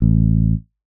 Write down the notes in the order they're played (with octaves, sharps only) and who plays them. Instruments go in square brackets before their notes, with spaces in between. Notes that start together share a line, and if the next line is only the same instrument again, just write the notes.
[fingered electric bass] A1